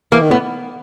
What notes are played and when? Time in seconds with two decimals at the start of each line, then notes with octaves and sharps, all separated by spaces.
0.12 E3 A#3
0.22 D#3
0.31 A2 B3